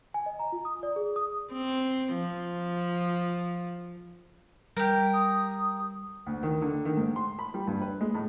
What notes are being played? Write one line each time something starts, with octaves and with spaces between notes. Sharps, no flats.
G#5
D#5
A#5
F4
D#6
D5
G#4
D#6
C4
F3
G3 G4 A#4
D#6
D2
D#3
D3
D#3
G#2
C6
B5
G3
G2
B4
G#3
A2